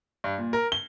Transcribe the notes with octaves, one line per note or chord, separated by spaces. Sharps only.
G2
A#2
A#4
G7